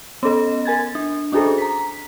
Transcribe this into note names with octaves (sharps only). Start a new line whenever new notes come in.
B3 C#4 A4 D#5
A#4 G#5 G#6 A6
D4
C#4 D4 F#4 G#4 A4 C5
A#5 B6